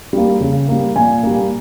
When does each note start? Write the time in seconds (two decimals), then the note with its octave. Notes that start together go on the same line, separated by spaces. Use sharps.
0.13 G3 A#3
0.41 C#3
0.68 G3 A#3
0.96 A#2 G#5
1.23 G3 A#3